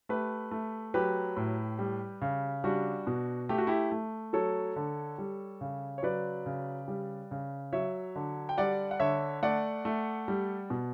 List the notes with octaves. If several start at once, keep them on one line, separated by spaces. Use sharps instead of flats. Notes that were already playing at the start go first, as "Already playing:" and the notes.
A3 G4 B4
A3
F#3 G4 B4
A2
G3
C#3
G3 D4 F#4
B2
A3 G4
F#4
E4 G4
A3
F#3 A4 C#5
D3
G3
C#3
C#5
F#3 B4 D5
C#3
G3
C#3
F#3 C#5 E5
D3
G5
G3 D5 F#5
F#5
D3 C#5 E5
A3 D5 F#5
A3
G3
B2